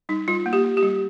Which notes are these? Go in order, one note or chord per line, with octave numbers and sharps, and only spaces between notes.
G3 D#4
G3 F4
A#3
G4
A#3
G4
G3